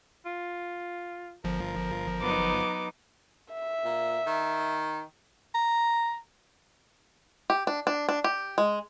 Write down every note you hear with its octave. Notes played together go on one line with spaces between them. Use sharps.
F4
G1 F3 A#4
F#3 B3 D#4 D6
E5
A#2
D#3
A#5
G4
D4
D4
D4
G4
G#3